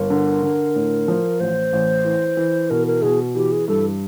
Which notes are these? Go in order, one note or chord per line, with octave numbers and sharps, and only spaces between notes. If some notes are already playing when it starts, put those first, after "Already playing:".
Already playing: G1 A#4
D3
D3
A2
F3
A1 C5
A1
E3
E3
B2 A#4
A#4
B2 G#4
E3 G4
G#4
G2 A4